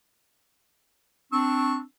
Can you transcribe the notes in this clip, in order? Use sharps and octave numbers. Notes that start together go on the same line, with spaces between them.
C4 D4 C#6 E6